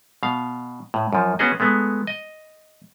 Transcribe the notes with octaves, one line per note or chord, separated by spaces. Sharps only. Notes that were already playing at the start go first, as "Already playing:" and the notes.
B2 F5
A2
F#2 F3
B3 C#4 F#4 G#4 D#5
G#3 A3 B3
D#5